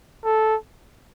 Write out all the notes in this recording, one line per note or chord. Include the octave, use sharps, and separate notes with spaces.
A4